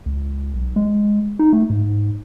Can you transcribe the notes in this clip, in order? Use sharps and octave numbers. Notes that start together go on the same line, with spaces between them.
C#2
B1
G#3
D#4
A3
G#2